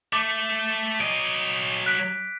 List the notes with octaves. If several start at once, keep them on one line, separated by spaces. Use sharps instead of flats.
A3 D6
F#3 D#5 D7
F#6 B6 D7